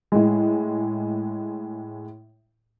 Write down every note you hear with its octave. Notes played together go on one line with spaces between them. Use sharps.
A2 G#3